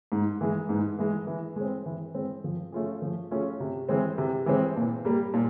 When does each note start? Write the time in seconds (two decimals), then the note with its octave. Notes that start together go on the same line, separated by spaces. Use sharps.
0.12 G#2
0.41 E3 G#3
0.69 G#2
0.99 E3 G#3
1.27 E3
1.56 G#3 C4
1.86 E3
2.14 G#3 C4
2.44 F3
2.72 A3 C#4 F4 G#4
3.02 F3
3.31 A3 C#4 F4 G#4
3.60 C3
3.89 E3 G#3 C4
4.18 C3
4.46 E3 G#3 C4
4.76 A#2
5.05 G3 A#3
5.34 A#2